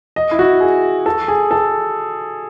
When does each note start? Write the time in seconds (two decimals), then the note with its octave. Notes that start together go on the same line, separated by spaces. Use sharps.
0.16 D#5
0.31 E4
0.39 F#4
0.60 G#4
1.06 A4
1.28 G#4
1.51 A4